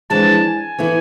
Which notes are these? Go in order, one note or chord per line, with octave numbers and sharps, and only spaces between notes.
F2 E3 G#3 D4 A5
G#5
E3 B3 E4 A4